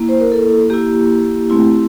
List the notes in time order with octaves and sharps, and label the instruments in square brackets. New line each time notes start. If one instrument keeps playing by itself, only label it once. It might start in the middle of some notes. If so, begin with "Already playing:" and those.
Already playing: [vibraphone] A#3 E4
C5
A#4
A4
A#3 E4 G4
A3 C4 E4